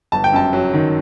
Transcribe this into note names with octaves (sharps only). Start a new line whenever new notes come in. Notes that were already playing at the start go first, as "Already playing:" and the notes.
G1 A5
G5
F#2 A5
F#3
D#3